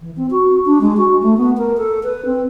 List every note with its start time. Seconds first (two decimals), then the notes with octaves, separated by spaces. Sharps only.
0.01 E3
0.17 C4
0.31 F#4
0.65 D4
0.81 G#3
0.97 F#4
1.22 A3
1.37 B3
1.58 A#4
1.78 A4
2.04 B4
2.25 C4